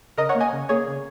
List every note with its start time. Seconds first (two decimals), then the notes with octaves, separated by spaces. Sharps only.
0.18 C#3 A#4 D#5
0.29 C#5 F#5
0.35 A#3
0.40 D#5 G#5
0.53 C#3
0.69 A#3 G#4 C#5
0.87 C#3